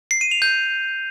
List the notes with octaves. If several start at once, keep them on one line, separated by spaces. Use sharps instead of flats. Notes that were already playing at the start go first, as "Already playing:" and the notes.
C7
D#7
F7
G6